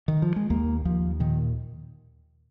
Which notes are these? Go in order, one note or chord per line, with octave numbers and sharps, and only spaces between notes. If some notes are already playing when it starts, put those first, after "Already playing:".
D#3
F3
G#3
D#2 A#3
D#2 F3
A#2 D#3